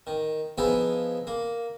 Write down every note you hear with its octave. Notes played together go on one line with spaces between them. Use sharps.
D#3
F3 B3 D#4 E4 G#4
A#3